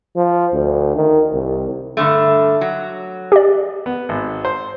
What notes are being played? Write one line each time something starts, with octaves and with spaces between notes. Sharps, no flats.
F3
D2
D#3
C2
G2 D3 A3
F#3
G4 D5
B3
G#1
C5